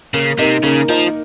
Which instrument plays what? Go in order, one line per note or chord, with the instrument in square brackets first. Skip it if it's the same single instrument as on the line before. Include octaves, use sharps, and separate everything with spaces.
[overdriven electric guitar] C#3 [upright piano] A#3
[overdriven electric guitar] C3 [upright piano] D#4 A#4
[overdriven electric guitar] C#3 [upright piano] A#3
[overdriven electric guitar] F3 [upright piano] D#4 A#4